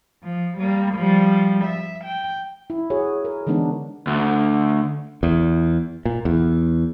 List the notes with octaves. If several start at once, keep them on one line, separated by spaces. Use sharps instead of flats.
F3
G3 A#3
F3 G3
E5
G5
E4
F#4 G#4 C#5
A#4
D3 E3 G#3 B3 D4 D#4
D2
E2
A#2
E2